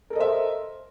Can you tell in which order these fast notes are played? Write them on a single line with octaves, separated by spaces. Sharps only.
A#4 A4 D#5 C5 E5